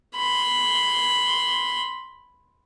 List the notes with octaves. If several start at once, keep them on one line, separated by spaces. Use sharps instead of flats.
B5 C6